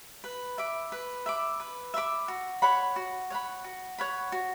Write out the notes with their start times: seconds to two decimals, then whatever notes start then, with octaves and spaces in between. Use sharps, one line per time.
0.24 B4
0.58 E5 B5 D6
0.92 B4
1.26 E5 B5 D6
1.60 B4
1.94 E5 B5 D6
2.28 F#4
2.62 C#5 F#5 B5
2.96 F#4
3.30 C#5 F#5 B5
3.64 F#4
3.98 C#5 F#5 B5
4.32 F#4